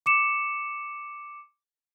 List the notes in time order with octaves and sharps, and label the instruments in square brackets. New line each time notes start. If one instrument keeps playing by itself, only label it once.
[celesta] D6 C#7 E7